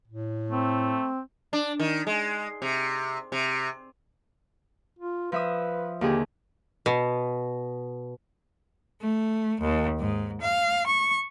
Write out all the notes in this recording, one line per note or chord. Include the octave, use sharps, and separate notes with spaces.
A2
A3 C4
D4
D#3
G#3
C3
C3
F4
F3 B4 E5 D#6
D#2 D3 G4 G#4
B2
A3
D#2
G#2
F5
C#6